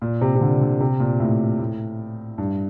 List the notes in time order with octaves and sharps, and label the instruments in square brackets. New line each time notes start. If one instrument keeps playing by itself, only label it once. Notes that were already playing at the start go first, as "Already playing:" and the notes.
[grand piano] A#2
C3
C3
D3
D3
C3
A#2
A2
A2
G2